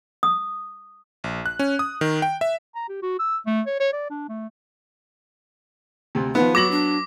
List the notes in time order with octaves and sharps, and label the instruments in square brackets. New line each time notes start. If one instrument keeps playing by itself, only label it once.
[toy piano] D#6
[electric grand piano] A#1
F#6
C#4
D#6
D#3
G5
E5
[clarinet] A#5
G4
F#4
E6
A3
C#5
C#5
D5
D4
A3
[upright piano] D2 C3
[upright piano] D#3 F3 [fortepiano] B3 [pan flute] B4
[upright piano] F#3 A#6 F#7 [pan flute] F#4 [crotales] D6
[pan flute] D4